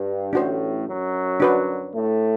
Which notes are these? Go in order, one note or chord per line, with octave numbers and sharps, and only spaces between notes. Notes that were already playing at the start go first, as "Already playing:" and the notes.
Already playing: G2
A1 A2 D4 F#4 C5
F#2 F#3
D4 F#4 B4 D5
A2 A3